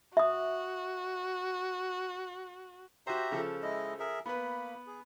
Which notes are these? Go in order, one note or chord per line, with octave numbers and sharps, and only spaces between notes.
F#4 E5 D#6
F#4 G4 C5 E5 A#5
C#3 F3 A4
G#3 E4 D#5
G#4 A#4 E5
A#3 B3 B4 B5
G#4